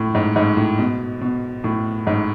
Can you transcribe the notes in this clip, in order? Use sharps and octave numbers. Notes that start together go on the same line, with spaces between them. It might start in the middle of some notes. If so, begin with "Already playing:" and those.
Already playing: A2
G#2
G#2
A2
B2
B2
A2
G#2